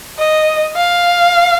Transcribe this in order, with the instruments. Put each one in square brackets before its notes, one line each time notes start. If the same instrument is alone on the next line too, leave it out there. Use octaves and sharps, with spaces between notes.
[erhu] D#5
F5